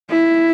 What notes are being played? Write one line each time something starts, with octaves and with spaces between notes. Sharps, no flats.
E4